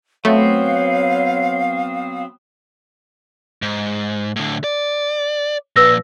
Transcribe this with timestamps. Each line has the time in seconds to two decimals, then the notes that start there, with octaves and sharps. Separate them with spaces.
0.25 F#3 A3 B3 C4 C#5 F5
3.62 G#2
4.36 A2 D3
4.64 D5
5.76 A#2 F3 B4 E6 A#6